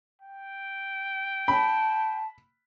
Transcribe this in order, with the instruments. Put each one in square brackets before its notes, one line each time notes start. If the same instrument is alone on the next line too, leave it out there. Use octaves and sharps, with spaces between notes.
[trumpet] G5
[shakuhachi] A5 [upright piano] B5